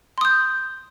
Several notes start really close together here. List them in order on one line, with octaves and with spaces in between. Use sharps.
C6 D#6 G6